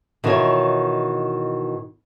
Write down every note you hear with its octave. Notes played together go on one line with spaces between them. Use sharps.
B2 D#3 E3 F4 C#5